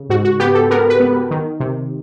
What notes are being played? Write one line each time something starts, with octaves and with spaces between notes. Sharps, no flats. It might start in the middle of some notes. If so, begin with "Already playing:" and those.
Already playing: C#3
G#2 F#4
F#4
B3 G4
A4
B3 A#4
B4
B3
D#3
C3